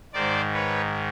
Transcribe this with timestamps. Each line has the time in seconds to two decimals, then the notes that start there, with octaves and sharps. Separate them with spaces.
0.13 G#2 D#3 C5 D5
0.54 B4 C#5